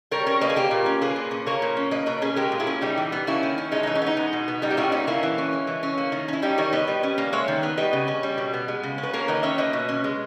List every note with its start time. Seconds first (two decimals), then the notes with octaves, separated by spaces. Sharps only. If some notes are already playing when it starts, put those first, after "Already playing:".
0.11 G3 A#4 C#5
0.27 C#4 A#4 C#5
0.41 A#3 B4 D#5
0.49 G#4
0.56 A#3 G4 A#4
0.71 A#2
0.86 C#4
1.01 A#3 G#4 B4
1.16 A#2
1.31 C#4
1.46 A#3 A#4 C#5
1.62 A#2
1.77 C#4
1.91 A#3 B4 D#5
2.06 B2 A#4 C#5
2.21 C#4 G#4 B4
2.36 G#3 G4 A#4
2.52 A#2
2.60 E4 G#4
2.67 C#4
2.81 G3 D#4 G4
2.97 E3
3.12 B3
3.27 A#3 C#4 E4
3.43 D#3
3.58 C#4
3.72 G#3 D#4
3.83 E3 D#4
3.95 C#4
4.02 B3 D#4
4.17 G#3
4.33 B2
4.48 B3
4.62 G3 D#4
4.71 G4
4.77 A#2 C#4 E4
4.92 B3 D#4
5.07 A#3 C#4 E4
5.23 E3
5.38 C#4
5.53 G#3
5.67 E3
5.83 C#4
5.98 A#3
6.12 D#3
6.28 C#4 E4
6.42 G3 D#4 G4
6.58 D#3 A#4 C#5
6.72 B3 B4 D#5
6.87 G3
7.03 C#4
7.18 A#3
7.33 G#3 C#5 E5
7.48 D#3
7.63 B3
7.77 G3 B4 D#5
7.93 C#3
8.08 C#4
8.23 G3
8.38 B2
8.53 B3
8.68 G#3
8.83 C#3
8.98 C#4
9.03 B4
9.13 A#3 A#4 C#5
9.28 D#3 B4 D#5
9.43 C#4 C#5 E5
9.58 A#3 B4 D#5
9.73 B2
9.89 C#4
10.04 G#3